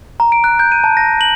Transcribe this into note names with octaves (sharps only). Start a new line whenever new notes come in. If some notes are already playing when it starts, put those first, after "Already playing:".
A#5
D7
F#6
G6
D#7
A5
A#6
F#7